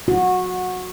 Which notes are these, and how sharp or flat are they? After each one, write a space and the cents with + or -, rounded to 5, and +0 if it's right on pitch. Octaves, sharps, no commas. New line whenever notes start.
F#4 -20